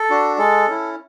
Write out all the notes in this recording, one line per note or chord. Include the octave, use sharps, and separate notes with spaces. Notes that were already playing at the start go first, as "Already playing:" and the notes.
Already playing: A4
D4 F#4
G#3 A4
C#4 E4